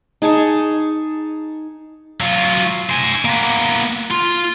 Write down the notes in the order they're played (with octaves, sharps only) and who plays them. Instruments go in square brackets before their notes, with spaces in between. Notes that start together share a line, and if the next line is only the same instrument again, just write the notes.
[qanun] D#4 G#4 A5 C#6
[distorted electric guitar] F#3 F4
C5 G#5
A#3 B3
F4